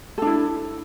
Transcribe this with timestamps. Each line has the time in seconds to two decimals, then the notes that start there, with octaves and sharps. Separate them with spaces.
0.18 A4
0.22 D4
0.26 E4